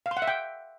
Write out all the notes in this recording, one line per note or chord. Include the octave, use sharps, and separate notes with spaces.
F5
C6
F#5
E5
G5